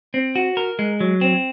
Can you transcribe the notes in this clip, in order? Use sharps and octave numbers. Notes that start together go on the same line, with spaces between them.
C4
F#4
A#4
G#3
F#3
C4